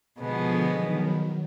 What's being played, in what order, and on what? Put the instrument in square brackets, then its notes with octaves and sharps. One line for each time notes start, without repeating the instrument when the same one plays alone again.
[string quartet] B2 G#3 B3 [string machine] D3 F3
[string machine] D#3 F#3